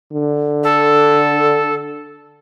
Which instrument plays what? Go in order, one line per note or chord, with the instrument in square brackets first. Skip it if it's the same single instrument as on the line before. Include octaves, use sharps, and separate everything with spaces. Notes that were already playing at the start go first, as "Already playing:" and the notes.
[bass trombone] D3
[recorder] A4